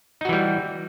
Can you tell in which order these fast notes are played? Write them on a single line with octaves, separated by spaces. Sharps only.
D#4 F#4 E3 G3